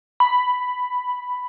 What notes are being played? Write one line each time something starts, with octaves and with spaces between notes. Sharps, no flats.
B5